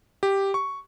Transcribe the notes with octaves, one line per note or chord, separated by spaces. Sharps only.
G4
C#6